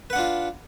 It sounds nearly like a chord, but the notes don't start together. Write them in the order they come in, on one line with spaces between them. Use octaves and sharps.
B4 F#5 D4 F4